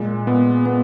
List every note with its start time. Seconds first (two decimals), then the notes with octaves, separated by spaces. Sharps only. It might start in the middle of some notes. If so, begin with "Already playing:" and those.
Already playing: A#2 G#3
0.27 A#2 B3
0.66 B3